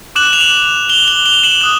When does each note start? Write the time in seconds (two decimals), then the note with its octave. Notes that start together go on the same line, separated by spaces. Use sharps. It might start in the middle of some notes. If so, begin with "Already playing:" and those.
0.15 D6 F#6 E7 F#7
0.33 F7
0.40 E7 F#7
0.89 F7 G7
1.07 F7 G7
1.26 F7 G7
1.43 E7 F#7
1.61 D#6 F#6